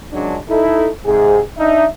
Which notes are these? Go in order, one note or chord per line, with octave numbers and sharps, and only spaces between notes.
A#2 C#3 F#3 G#3 D4
D#4 E4 A4
G#2 C3 G#4
D4 D#4 E5